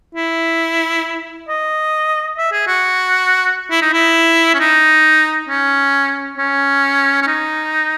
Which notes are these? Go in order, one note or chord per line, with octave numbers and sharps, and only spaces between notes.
E4
D#5
E5
G#4
F#4
E4
D#4
E4
C#4
D#4
C#4
C#4
C#4
D#4